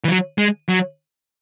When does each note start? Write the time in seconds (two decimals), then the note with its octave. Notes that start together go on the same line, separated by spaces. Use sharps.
0.04 E3
0.08 F#3
0.38 G#3
0.69 F#3